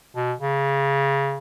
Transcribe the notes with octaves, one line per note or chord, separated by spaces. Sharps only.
B2
C#3